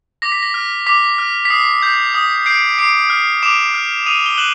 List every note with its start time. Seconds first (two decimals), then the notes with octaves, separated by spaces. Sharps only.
0.22 D6 A#6
0.32 B6
0.43 A#6
0.54 F6
0.87 D6 B6
1.18 F6
1.45 B6
1.50 D#6 C7
1.83 G6
2.14 D#6
2.46 G6 C7 D7
2.78 D6 C7 D7
3.10 F6
3.42 D6 D7 E7
3.74 F6
4.06 D#6 D#7 F7
4.26 G7
4.38 F#6 E7 F#7